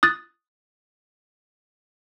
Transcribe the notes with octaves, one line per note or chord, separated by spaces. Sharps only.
D#6 F#6 A6